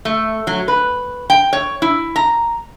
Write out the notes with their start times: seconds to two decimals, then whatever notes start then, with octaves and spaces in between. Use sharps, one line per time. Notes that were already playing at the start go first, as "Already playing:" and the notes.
0.05 A3
0.47 F#3
0.68 B4
1.30 G5
1.53 C#5
1.82 E4
2.16 A#5